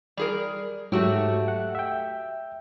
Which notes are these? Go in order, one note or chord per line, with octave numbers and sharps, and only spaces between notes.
G3 G#4 A#4 D5
G#2 F#3 A3 F#4 G4 E6
F#5
E5 G5